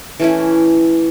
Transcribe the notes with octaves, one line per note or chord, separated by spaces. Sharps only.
E3 A3 C#4 E4